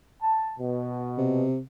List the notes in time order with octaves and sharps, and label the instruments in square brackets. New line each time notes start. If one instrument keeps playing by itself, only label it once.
[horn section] A5
B2
[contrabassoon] C3